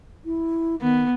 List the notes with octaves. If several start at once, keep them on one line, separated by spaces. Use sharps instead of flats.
E4
D#3 B3